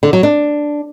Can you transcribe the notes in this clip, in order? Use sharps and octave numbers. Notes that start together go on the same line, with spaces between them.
D3
F#3
D4